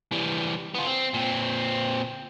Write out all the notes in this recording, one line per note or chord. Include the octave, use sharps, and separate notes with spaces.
E3 G3
B3 F4
C4
A#2 C4